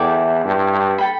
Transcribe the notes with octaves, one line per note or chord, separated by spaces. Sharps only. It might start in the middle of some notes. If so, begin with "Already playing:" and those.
Already playing: E2 E4 A4 D5 G5
G2
A4 G5 B5